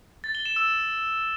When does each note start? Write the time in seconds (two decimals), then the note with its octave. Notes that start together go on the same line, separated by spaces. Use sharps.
0.24 A6
0.35 G7
0.46 E7
0.56 E6